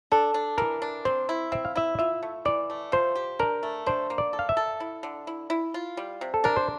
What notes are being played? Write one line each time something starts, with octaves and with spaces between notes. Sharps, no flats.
D4 A4
D4
E3 A#4
D4
C4 C5
E4
C4 E5
F5
E4 E5
F4 E5
A3
E3 D5
A3
F3 C5
G4
D4 A#4
A3
D4 C5
A#3
D5
A4
F5
E5
A4
E4
D3
E4
E4
F4
G3
C3
A4
D4 A#4
C5